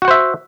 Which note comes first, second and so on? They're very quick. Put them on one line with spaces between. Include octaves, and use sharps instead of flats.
F#4 F#5 C5 E5